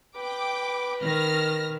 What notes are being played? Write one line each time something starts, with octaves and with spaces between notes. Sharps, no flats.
B4 G5 D6
D#3 F6 A#6